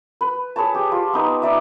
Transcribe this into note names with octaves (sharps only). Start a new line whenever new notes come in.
B4
G#4 B4 C#5 A5
G4
F4 C6
B3 D#4 B4
D#4 D5 E5